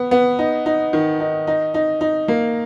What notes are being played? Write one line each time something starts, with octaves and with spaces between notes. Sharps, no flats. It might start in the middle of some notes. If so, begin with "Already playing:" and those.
Already playing: B3
B3
D#4
D#4
D#3
D#4
D#4
D#4
D#4
A#3